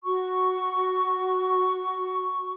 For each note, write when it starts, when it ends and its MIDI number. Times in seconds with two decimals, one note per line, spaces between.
0.04 2.52 66
0.04 2.52 85